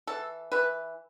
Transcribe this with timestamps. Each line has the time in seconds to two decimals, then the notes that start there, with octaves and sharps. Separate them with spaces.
0.07 E3 A4
0.52 E3 B4